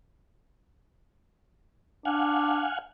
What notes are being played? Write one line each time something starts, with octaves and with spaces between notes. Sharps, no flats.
D4 F5 F#5 G#5